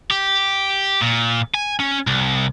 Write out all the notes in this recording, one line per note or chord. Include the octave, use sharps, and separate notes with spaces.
G4
A#2
G#5
C#4
C2